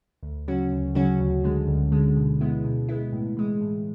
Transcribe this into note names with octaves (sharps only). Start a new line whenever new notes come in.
D2
C#3 F#3 C#4 F#4
D2
C#3 F#3 C#4 F#4
D2
D3 G#3
D2
D3 G#3
B2
G#3 B3 E4
B2
G#3 B3 E4
A2
E3 G#3
A2